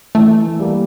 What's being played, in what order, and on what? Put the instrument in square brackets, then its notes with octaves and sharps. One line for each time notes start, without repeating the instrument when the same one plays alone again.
[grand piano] E3 [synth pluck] A3
[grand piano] G3 A#3